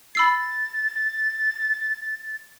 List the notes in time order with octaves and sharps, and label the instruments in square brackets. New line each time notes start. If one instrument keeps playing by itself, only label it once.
[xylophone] B5 E6 C7 [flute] A6